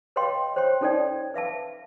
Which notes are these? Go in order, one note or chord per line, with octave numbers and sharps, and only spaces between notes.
B4 C#5 D#5 F5 G5 C6
C5 C#5 G5 C6
C#4 D#4 A4 C#5 D5 G5
B4 E5 F5 A5